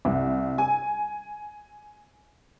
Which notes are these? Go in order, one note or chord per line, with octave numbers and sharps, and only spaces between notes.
C2
G#5